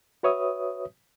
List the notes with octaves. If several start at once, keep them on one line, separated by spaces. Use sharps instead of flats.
F#4 B4 C#5 E5 D#6